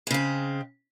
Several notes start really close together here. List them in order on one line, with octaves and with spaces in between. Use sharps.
G#3 C#3 C4